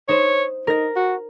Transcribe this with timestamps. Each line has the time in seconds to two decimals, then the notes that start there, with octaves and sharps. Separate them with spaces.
0.09 D#4 C5 C#5
0.67 D#4 A#4 A#6
0.96 F#4